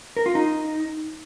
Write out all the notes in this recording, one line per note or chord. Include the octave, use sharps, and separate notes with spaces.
A#4
F4
D#4